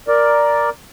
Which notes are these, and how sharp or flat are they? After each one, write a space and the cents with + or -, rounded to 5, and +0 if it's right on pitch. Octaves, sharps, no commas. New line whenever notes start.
A#4 +5 D5 +0